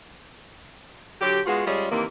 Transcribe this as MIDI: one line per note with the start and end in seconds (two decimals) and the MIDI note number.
1.21 1.41 50
1.21 1.41 54
1.21 1.41 67
1.46 1.65 56
1.46 1.65 59
1.46 1.65 65
1.46 1.65 66
1.66 1.87 55
1.66 1.87 56
1.66 1.87 61
1.66 1.87 65
1.66 1.87 68
1.91 2.04 48
1.91 2.04 51
1.91 2.04 52
1.91 2.04 58